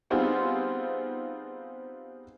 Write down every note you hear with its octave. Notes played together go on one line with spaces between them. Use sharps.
G3 B3 C4 D#4 F4 G#4